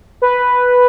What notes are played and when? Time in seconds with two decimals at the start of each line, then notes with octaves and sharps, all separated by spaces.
0.22 B4